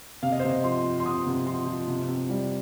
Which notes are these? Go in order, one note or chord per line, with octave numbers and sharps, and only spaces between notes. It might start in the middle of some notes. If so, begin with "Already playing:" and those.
C3 F5
D#5
C5
C3 D#5
F3 C6
F3
C6
C3 D#6
C3
F3 C6
F3
C3
C3
G3